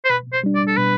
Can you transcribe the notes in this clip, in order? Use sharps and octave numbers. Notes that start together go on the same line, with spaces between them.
C5
B2 B4
C5
G3 D4
D5
A4
B2 B4